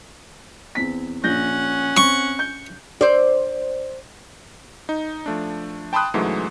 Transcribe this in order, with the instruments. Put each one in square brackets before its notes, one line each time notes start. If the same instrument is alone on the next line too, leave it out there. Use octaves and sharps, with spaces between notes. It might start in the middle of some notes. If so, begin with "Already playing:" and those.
[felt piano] E2 C4 B6
[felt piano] A#1 G6 A#6 [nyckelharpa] C#4 F#5
[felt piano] C4 [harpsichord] C#6
[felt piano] G6
[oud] C5 D5
[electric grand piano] D#4
F3 A3 D4
G5 A5 B5 C6 D#6 F#6
G#2 C#3 E3 F#3 G#3 A3